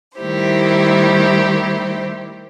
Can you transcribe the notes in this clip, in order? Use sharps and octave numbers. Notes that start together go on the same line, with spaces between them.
D#3 G3 A3 E4 G4 C5